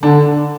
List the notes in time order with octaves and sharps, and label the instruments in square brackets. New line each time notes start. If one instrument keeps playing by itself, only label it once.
[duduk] D3 [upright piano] D4